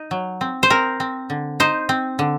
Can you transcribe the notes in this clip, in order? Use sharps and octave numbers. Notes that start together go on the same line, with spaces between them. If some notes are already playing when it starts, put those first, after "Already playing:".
Already playing: D#4
F#3
C4
C5
C4 A#4
C4
D3
D#4 C5
C4
D3